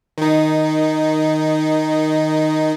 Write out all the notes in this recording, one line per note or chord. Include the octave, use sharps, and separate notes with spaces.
D#3 D#4